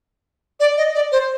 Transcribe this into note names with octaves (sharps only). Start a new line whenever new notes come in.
D5
D#5
D5
C5